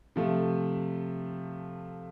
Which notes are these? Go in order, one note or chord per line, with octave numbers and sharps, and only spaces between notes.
C3 F3 A3